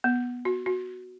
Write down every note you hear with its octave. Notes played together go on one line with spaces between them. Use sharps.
B3
F#4
F#4